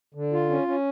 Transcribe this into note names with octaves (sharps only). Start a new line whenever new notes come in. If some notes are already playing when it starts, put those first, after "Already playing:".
D3
F4
C#4
C#4